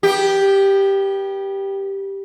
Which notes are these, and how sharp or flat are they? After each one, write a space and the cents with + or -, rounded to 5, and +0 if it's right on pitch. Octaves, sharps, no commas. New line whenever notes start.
B3 -35 G4 +0